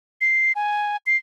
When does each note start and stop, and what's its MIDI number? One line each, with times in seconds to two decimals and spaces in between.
0.21 0.52 96
0.55 0.97 80
1.06 1.16 96